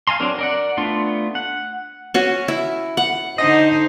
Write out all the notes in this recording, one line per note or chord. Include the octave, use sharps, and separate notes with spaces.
F5 G#5 A#5 C6
F#3 C4 D4 A#4
A#4 D5 F#5
A3 B3 D4 F4 C6
F#5
C#4 F#4
E4
F#5
D3 D#4 C5 D#5